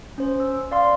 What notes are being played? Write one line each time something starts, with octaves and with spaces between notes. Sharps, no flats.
C#4 C5
E6
D5 F5 C6